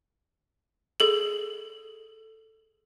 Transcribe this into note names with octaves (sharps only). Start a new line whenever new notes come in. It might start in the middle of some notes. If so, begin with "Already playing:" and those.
G#4 A4 F#7